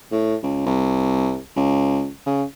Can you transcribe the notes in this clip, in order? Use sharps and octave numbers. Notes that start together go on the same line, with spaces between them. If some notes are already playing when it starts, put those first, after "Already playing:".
A2
C#2
C2
C#2
C#3